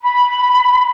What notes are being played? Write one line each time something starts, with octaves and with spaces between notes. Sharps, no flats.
B5